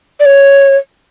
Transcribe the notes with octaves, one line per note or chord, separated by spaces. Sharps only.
D5
C#5